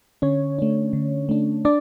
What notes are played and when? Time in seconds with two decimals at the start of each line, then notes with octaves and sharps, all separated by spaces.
0.22 D3 C#4 C#5
0.59 A3 D4
0.93 D3
1.29 A3 D4
1.65 D4 D5